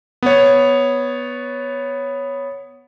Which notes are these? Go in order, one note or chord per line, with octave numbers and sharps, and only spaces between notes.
B3 C#5